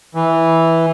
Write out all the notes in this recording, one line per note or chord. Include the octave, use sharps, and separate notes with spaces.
E3